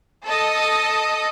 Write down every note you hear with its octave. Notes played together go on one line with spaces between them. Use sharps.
A4 D#5